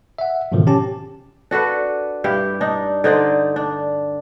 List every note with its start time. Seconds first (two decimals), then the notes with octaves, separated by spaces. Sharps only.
0.18 E5 F#5
0.52 G#2 B2 D3 D#3 F3
0.67 C#4 G4 A5
1.51 D4 F#4 A4 B4
2.24 G2 E4 G4
2.61 D4 D#4
3.04 D3 D#4 C5 D5
3.56 D4